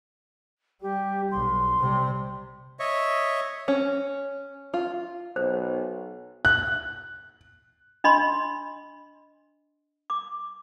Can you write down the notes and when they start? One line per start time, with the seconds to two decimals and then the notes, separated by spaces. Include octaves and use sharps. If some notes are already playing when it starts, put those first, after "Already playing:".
0.82 G3 G4
1.31 B1 C6
1.80 C3 G3
2.80 C#5 D#5 E5 C#6
3.68 C#4
4.74 F4
5.36 B1 C5
6.45 F#6
8.04 D4 D#5 B5 C6
10.10 D6